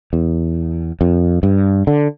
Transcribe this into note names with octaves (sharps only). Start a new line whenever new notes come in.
E2
F2
G2
D3